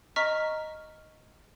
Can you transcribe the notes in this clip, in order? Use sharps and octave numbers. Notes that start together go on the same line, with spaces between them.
D#5 A#5 C#6 F6 B6